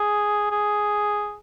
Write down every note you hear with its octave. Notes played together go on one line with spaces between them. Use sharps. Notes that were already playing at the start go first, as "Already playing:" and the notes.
Already playing: G#4
G#4